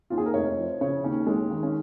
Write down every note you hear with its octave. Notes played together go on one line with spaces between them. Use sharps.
D#2 F4
G#4
A#4
F1 C#5
F3
C#3 C#5
D#2 C#4
D#2 G#3
D#3
C#4